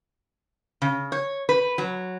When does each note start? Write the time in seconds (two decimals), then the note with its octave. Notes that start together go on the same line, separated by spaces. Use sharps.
0.82 C#3
1.12 C#5
1.49 B4
1.78 F#3